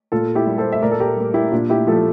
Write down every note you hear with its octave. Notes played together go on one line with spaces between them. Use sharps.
A#2 F4 A4
E4 G4
G3 A#3
A4 C5
E5
A#2 A#4 D5
A4
G4 A#4
G3 A#3
E4 G4
A#2 D4 F4
E4 G4
F3 A3 F4 A4